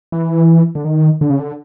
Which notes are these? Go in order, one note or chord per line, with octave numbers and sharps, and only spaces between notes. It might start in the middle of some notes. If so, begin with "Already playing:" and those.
E3
D3
D#3
D3
C#3
D3